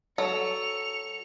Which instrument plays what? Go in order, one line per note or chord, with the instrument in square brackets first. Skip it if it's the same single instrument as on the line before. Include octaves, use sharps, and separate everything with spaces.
[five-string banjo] F#3 A4 [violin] C#7 F7